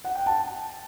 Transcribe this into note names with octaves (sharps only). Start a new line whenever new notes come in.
F#5
G5
A5